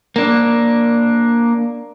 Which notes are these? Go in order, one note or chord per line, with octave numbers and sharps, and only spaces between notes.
A#3 D4